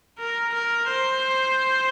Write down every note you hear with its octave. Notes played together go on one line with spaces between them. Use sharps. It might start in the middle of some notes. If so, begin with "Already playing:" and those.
A#4
A#4
C5